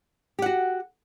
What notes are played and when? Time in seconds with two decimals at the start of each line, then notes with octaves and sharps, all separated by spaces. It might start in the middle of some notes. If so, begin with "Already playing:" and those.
0.39 G4
0.42 F#5
0.46 F#4